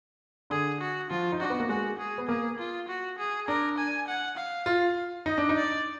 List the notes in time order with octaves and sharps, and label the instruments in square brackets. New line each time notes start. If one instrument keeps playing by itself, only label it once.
[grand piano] D3 [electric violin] G#4
[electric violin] F#4
[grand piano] F3 [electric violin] F4
[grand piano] D#4
[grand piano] D4 [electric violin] F#4
[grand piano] B3
A#3
[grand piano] G#3 [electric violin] F#4
[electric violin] G#4
[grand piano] B3
[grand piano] A#3 [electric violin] G#4
[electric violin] F4
F#4
G#4
[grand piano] D4 [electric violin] A#4
[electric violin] G#5
F#5
F5
[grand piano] F4
[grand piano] D#4 [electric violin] D#5
[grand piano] D4
D#4
[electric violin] D5